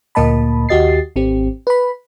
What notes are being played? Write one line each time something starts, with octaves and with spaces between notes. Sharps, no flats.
D2 A#2 A#3 D#5 A5 B5
D#2 F#4 G4 D#5 A6 C7
G#1 C4 G4
B4 B5